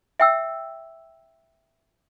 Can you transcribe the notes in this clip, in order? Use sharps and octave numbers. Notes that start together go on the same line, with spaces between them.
E5 G5 E6